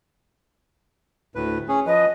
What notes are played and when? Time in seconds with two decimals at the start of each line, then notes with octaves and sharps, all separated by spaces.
1.35 D2 A2 B4
1.69 C#4 G#4
1.87 F3 B4 D#5